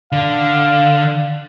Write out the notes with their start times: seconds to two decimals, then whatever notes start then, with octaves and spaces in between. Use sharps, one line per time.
0.12 D3 F5